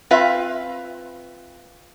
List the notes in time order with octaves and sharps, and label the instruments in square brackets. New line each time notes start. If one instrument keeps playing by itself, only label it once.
[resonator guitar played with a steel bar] C4 F4 B4 E5 F5